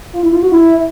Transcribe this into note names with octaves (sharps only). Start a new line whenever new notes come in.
F4
E4
F4
F#4
E4